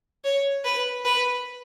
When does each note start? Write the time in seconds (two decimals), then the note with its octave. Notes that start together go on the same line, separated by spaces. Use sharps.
0.25 C#5
0.65 B4
1.05 B4